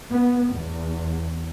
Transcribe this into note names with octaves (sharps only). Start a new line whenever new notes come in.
B3
E2